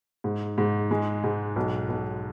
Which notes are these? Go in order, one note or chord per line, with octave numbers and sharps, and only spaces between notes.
G#2
G#2
G#3
G#2
B1
B1